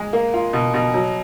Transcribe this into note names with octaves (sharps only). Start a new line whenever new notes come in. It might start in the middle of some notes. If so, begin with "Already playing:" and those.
Already playing: G#3
A#3
F4
B2
B2
F#3